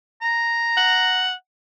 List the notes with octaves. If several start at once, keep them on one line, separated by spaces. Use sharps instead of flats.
A#5
F#5